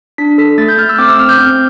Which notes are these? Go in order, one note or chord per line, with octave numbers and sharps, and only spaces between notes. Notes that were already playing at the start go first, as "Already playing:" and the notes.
D4 B6
A4 B6
A3 A6
G6
A3 F6
E6
C4 D6
E6
C4 F6
G6
C4